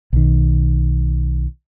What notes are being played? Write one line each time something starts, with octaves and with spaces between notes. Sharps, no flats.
B1 D#3